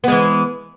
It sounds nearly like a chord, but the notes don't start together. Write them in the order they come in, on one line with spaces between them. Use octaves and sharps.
B3 G#3 E3